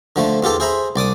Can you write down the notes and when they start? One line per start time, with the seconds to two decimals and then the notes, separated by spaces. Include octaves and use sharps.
0.16 D3 F3 A3
0.43 E2 F4 G4 A4
0.60 G#4 C5 E5 A#5 B5
0.96 C2 D5 D6 D#6